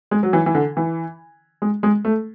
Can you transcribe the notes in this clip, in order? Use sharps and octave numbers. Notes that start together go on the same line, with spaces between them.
G#3
F#3
E3
E3
D3
E3
G#3
G#3
A3